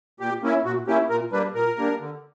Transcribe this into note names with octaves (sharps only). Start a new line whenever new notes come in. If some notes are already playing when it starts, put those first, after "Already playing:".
A#2 G4
A#3 C#4 E4
A#2 F#4
A#3 C#4 E4 G4
A#2 A#4
G3 A#3 D4 B4
A#2 A#4
G3 A#3 D4
D3